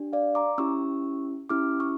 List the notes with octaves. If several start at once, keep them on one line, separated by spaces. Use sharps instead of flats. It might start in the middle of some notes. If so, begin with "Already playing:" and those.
Already playing: D4 G4
D5 F5
A#5 D6
C#4 E4 G4 C#6 E6
C#4 E4 G4 D6 F6
C#6 E6